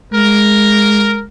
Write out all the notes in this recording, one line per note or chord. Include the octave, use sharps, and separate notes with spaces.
G#3 A#4